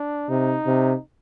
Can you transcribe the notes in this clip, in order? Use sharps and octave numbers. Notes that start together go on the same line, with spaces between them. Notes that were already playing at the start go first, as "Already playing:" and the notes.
Already playing: D4
C3 D#4
C3